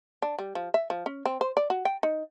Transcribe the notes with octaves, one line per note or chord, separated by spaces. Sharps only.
D4
G3
F3
E5
F3
C#4
C4
C5
D5
F#4
G5
D#4